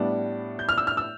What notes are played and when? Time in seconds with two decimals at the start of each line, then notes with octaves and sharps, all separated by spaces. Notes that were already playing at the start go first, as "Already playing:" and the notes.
Already playing: A2 G3 B3 D4
0.59 G6
0.69 F6
0.78 E6
0.87 F6
0.97 E6